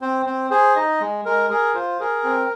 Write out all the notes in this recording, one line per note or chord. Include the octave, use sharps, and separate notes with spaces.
C4 C5
C4 C5
G#4 C5
D#4 D#5
G#3
G#3 A#4
G#4 A#4
F4 C5
G#4 A#4
C4